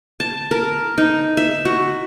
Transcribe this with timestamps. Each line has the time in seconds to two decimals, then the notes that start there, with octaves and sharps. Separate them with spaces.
0.20 A5
0.51 A#4
0.98 D#4
1.37 E5
1.65 F#4